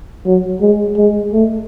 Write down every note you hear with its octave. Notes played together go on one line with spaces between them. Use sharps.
F#3
G#3
G#3
A3